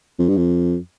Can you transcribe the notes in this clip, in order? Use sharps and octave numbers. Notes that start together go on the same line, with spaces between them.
F2
G2
F2